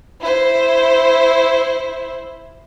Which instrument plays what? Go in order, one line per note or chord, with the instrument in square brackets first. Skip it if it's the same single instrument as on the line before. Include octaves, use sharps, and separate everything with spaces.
[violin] E4 C5